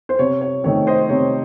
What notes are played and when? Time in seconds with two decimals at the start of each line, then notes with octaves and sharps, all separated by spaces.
0.09 C5
0.19 C3 C#5
0.41 C#5
0.64 D#3 A3 C4 C#5
0.87 C5 D#5
1.09 C3 C#5